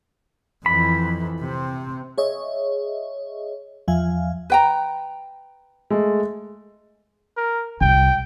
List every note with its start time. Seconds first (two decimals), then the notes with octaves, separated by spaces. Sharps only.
0.66 F2 E3 B5
1.40 C3 C4
2.18 G#4 C#5 D#5 E5
3.88 E2 F3 E5 F5 G#5
4.50 B4 G5 A#5
5.90 G#3 A3 A4
7.37 A#4
7.81 C2 G5